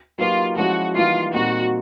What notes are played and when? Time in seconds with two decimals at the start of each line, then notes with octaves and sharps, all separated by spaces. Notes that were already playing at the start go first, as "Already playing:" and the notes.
0.18 F#3 A#3 D#4 F4 G4 B4
0.57 F3 G#3 C#4 E4 F#4
0.95 E3 G3 A#3 D#4 F4 G4
1.33 A#2 G3 C4 D#4 F#4